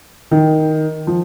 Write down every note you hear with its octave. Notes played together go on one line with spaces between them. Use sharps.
D#3
F3